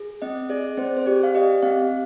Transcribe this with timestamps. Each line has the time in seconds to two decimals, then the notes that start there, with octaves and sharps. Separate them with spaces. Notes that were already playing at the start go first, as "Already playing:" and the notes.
Already playing: G#4
0.22 C4 D#5
0.49 G#4 D5
0.77 C4 C5
0.97 C5
1.06 G4 D5
1.23 F5
1.35 G4 D#5
1.63 C4 F5